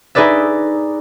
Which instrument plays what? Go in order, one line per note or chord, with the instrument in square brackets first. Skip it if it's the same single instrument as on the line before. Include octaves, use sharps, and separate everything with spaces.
[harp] D#4 G#4 B4 D5 E5